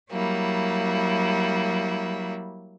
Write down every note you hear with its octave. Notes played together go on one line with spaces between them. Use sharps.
F#3 G3 A#3 E4